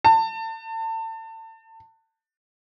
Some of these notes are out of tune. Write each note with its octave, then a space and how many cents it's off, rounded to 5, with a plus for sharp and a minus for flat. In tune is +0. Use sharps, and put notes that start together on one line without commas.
A5 +30